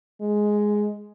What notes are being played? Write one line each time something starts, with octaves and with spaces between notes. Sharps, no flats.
G#3